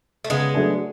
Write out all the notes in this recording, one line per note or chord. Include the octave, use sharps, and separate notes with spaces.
A3
C#3 G#3 B3
F#3 A3 D4 G#4